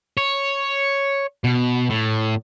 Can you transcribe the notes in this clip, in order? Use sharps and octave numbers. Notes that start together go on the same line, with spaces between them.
C#5
B2
A2